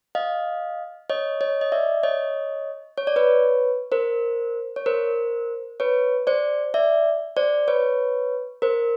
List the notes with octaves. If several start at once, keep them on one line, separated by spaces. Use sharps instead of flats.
D#5 F5
C#5 D#5
C#5 D#5
D#5
D5 E5
C#5 D#5
C#5
D5
B4 C#5
A#4 C5
C#5
A#4 C5
B4 C#5
C5 D5
D5 E5
C5 D5
B4 C#5
A#4 C5